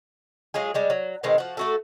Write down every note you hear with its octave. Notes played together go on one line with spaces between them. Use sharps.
F#3 G#3 F4 G#4
G3 G#3 D4
F#3
B2 D#3 G#3 C4
F3 F#4
A3 F#4 A4